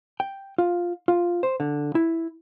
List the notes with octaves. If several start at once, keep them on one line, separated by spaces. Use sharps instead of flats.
G5
F4
F4
C5
D3
E4